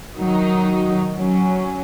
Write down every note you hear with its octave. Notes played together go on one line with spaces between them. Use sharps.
D#3 F#3 D#4
F#3 C#4